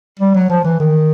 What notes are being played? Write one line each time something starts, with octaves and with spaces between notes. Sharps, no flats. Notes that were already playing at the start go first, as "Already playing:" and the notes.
G3
F#3
F3
E3
D#3